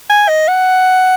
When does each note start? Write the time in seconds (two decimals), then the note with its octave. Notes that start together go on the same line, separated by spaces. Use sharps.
0.10 G#5
0.28 D#5
0.48 F#5